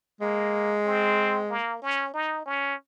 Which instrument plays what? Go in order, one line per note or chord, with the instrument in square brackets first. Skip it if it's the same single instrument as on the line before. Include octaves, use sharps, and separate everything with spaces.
[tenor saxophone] G#3 [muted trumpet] A#3
[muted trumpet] C4
A#3
C#4
D#4
C#4